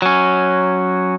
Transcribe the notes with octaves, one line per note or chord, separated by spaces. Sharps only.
F#3 C#4